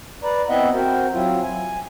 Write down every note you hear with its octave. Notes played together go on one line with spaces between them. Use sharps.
B4 D5 A#5
B3 C4 E4 D#5 E5 F#5
C4 F#4 A#4 C5
F#3 C4 E4 F4
G#5